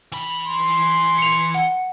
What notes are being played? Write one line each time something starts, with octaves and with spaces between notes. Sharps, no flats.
E3 B5
C6
C#7 F7
F#5